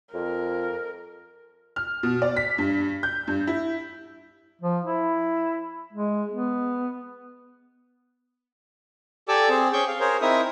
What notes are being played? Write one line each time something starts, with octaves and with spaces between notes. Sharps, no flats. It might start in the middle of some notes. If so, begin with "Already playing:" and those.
F2 A#4
F6
B2
D5
B6
G2
G6
G2
E4
F3
E4
G#3
B3
G4 A4 D5 G#5 D6 E6
C4 G#4
C#4 G#4 G5 C#6 G6
F5
G#4 A#4 C5 C#5
C4 D#4 E4 A#4 E5 D#6